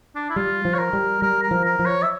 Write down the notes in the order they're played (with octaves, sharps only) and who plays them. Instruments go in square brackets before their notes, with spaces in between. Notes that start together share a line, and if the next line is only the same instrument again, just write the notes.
[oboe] D4
E4
[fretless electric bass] G3 [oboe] F4
[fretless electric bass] F3
[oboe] C#5
A#4
[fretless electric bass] G3
[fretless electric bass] G3 [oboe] A#4
[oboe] A#4
[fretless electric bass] F3
[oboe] A#4
[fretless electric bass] F3
[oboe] C#5
E5